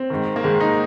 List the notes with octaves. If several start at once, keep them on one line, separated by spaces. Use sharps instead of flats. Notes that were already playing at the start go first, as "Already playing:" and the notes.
Already playing: C4
G#2 D#3
A#3
G#2 D#3 G#3
D#4